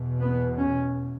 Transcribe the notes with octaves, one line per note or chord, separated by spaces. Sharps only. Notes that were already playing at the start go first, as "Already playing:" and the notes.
Already playing: E2 B2
B3
C#4